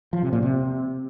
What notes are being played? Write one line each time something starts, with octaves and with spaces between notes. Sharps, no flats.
F3
C3
A#2
C3